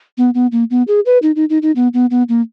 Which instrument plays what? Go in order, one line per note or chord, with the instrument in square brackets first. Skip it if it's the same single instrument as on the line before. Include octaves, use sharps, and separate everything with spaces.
[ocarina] B3
B3
A#3
B3
G#4
B4
D#4
D#4
D#4
D#4
B3
B3
B3
A#3